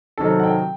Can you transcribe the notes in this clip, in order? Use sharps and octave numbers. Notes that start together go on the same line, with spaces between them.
C3 D#3 F#3 C4 A4
F#5
G5